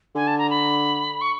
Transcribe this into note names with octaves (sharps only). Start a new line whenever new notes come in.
D3 G#5
A5
A#5
B5
C#6